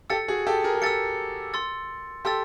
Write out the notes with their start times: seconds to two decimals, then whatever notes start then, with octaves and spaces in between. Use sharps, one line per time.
0.10 G4 A4 E6 A6 C#7
0.28 F#4 G#4
0.47 G4 A4
0.64 G#4 A#4
0.75 G#4
0.82 G4 A4 E6 A6 C#7
1.54 C6 E6 A6
2.25 G4 A4 C6 E6 A6